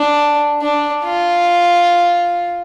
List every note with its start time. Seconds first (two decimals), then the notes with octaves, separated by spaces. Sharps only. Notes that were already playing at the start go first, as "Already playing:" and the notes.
Already playing: D4
0.62 D4
1.03 F4